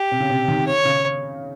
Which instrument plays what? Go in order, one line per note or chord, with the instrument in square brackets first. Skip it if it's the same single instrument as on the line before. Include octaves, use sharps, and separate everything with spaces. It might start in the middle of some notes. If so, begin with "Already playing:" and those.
Already playing: [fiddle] G4
[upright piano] C3
C#3
C3
D#3
[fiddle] C#5
[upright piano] C#3